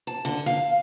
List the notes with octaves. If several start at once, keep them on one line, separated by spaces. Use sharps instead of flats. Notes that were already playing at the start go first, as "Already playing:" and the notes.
A5
D3
F5